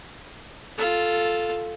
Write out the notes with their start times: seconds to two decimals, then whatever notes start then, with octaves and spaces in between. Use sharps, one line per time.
0.78 F4 A4